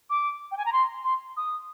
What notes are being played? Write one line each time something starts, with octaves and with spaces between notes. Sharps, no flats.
D6
G5
G#5
A#5
C6
C6
D#6